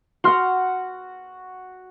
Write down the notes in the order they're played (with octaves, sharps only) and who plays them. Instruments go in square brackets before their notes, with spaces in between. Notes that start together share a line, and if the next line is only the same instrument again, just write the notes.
[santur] F#4 F#5 [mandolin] C6 F6